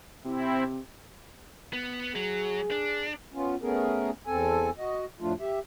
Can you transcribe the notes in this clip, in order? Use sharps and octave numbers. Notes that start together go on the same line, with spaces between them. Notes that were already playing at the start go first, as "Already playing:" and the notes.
C3 C4 E4
B3
F#3 G#4
D4
B3 C#4 F4
A3 B3 C#4 G#4 A#4
E2 C4 A4 G#5
F#4 D#5
F2 A2 F3 A3 D4 F4
G4 E5